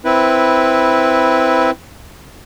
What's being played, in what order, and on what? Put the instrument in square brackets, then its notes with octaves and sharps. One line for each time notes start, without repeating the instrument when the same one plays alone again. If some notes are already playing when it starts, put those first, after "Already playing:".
[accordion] C4 E4 B4